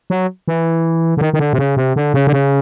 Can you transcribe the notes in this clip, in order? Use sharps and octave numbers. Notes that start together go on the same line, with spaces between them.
F#3
E3
D3
D#3
D#3
D3
C3
C#3
C3
D3
C#3
D3
C#3